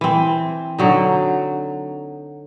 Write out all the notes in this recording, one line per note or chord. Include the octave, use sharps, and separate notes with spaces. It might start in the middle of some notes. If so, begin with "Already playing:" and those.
E3 C4
D3 F#3 D#4